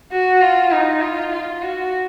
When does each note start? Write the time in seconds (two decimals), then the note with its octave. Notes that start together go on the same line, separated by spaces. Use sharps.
0.12 F#4
0.41 F4
0.72 D#4
1.02 F4
1.32 F4
1.62 F#4